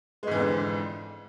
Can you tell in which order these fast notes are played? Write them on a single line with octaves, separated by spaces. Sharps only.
G#3 G#2 E3 F2 D3